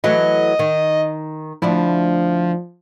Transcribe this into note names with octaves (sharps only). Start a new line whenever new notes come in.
E3 F#3 A3 D#5
D#3
D2 F3 D4 E4